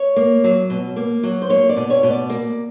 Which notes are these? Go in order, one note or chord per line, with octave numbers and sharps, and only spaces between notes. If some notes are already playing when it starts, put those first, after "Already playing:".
Already playing: C#5
A#3
F#3
B2
A#3
F#3
C5
A#3 C#5
D5
B2
C#5
B2
D5
A#3